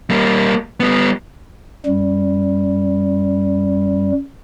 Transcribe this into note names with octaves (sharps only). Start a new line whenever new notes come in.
G3 A#3
G3 B3
F#2 G3